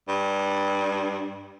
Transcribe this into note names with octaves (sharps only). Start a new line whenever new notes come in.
G2